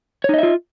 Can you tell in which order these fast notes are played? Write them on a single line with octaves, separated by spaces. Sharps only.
C#5 D#4 D#5 E5 F4